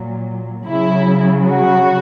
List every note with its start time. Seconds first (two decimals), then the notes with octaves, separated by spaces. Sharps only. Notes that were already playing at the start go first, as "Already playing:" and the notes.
Already playing: A#2 F#3
0.68 C#3 F#3 E4
1.47 F#4